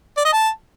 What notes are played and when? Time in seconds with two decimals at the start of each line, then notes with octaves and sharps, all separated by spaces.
0.17 D5
0.25 D#5
0.33 A5